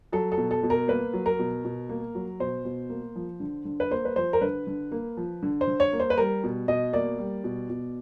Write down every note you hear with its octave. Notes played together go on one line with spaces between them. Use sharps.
F#3 A4
A4
B2
A4
B2
A#4
A#3 B4
F#3
A#4
B2
B2
A#3
F#3
B2 C5
B2
A#3
F3
D3
D3
B4
A#3 C5
B4
F3 C5
A#4
D3 B4
D3
A#3
F3
D3
C5
D3
C#5
A#3
C5
B4
G3 A#4
B2
B2 D#5
A#3 D5
G3
B2
B2